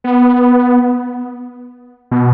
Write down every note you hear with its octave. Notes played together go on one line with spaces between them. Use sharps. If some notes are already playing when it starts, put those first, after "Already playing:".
B3
B2